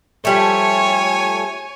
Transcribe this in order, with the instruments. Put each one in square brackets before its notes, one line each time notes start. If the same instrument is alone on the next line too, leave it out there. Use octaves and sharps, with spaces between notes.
[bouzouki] F3 G3 A3 [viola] C#5 G#5